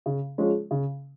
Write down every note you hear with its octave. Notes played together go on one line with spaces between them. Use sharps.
C#3
F3 G#3 C#4
C#3